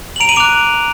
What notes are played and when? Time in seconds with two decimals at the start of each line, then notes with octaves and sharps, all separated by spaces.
0.16 F#7
0.20 A#5 D7 F7
0.29 D#7 F#7
0.36 D6 D7 F7
0.40 F#6